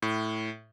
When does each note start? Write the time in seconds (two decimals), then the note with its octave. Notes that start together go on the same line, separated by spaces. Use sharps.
0.02 A2